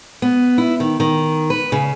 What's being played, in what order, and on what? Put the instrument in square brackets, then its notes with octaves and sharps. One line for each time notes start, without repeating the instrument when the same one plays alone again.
[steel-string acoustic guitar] B3
E4
D#3
D#3
B4
C#3